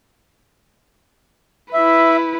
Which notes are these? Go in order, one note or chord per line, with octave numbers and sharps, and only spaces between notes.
E4 B4 E5